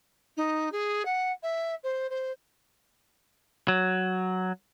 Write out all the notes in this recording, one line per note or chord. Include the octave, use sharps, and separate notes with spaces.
D#4
G#4
F#5
E5
C5
C5
F#3